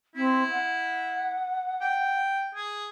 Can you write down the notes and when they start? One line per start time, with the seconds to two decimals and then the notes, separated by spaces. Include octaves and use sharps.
0.16 C4 E4
0.50 F#5
1.81 G5
2.55 G#4